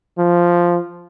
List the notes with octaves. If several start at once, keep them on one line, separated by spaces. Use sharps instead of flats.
F3